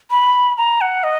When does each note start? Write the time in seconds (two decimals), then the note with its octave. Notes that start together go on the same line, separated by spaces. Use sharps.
0.11 B5
0.57 A#5
0.81 F#5
1.04 D#5